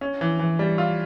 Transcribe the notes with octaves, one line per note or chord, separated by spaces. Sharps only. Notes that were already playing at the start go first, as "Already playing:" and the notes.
C#4
E3
E3
G3
F4